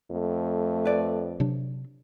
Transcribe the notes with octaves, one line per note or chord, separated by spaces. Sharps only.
F2 A3
B4 D5
C3 F#3 D4